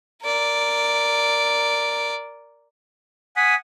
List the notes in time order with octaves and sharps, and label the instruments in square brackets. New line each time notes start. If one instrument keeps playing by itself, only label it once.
[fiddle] A#4 D5
[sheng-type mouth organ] F#5 G#5 D#6 [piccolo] B6